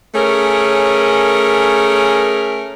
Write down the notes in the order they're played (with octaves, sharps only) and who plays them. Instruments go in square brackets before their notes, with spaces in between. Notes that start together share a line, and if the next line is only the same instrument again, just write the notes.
[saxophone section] A3 C#4 G#4 A#4